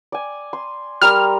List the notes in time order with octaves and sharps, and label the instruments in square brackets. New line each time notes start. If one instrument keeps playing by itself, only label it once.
[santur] D5 G#5
C6
[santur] G3 A#4 C6 [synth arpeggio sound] F6